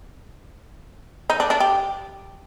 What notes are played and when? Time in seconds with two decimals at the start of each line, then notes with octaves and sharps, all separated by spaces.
1.30 D#4
1.40 D4
1.50 D4
1.60 G4